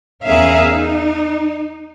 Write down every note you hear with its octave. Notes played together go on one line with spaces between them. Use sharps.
E2 C#4 G#4 A#4 E5 F5
D#4